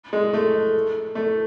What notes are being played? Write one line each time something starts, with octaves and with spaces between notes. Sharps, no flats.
G#3
A3
A3